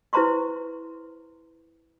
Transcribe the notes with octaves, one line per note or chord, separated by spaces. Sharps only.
E4 B4 C5 A#5 C6 C#6